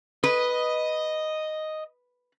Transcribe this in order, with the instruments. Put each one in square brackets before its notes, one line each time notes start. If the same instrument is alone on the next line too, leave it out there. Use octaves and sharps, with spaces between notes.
[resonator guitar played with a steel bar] B4 [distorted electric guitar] D#5